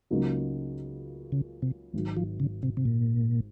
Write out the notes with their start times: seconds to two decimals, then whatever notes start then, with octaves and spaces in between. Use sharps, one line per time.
0.10 C#2 C#3 F#3 A#3 D#4
1.32 C#3
1.62 C3
1.93 G#1 G#2 D#3 F#3
2.17 F3
2.40 C#3
2.63 C3
2.77 C3
2.85 A#2